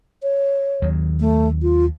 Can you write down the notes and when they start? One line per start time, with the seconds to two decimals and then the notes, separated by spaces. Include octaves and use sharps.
0.23 C#5
0.82 D#2 D#3 F#3
1.20 A3
1.62 F4